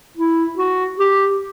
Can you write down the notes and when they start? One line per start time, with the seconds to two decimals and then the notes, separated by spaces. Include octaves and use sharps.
0.17 E4
0.57 F#4
0.98 G4